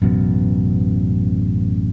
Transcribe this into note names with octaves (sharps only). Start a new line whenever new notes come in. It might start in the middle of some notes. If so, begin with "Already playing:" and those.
A1 F#2 B2